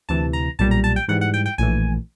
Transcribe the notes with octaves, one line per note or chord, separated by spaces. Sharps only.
D2 C3 E3 A5
A#5
B1 A#2 G3 A5
A#5
A5
G5
G#2 E3 G3 F#5
F#5
G5
G5
A#1 A2 E3 G#5